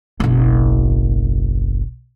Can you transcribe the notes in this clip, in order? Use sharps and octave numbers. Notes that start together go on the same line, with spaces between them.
F#1 B1